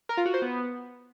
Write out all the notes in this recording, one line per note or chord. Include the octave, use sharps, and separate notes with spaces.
A#4
F4
F#4
C5
B3